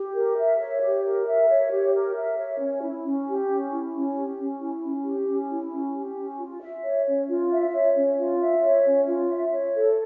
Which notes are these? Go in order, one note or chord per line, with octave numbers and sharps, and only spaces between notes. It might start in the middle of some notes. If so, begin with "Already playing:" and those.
Already playing: G4
A#4
E5
C#5
G4
A#4
E5
C#5
G4
A#4
E5
C#5
C#4
E4
C#4
G4
C#4
E4
C#4
G4
C#4
E4
C#4
G4
C#4
E4
C#4
G4
C#4
F4
E5
C#5
C#4
F4
E5
C#5
C#4
F4
E5
C#5
C#4
F4
E5
C#5
A4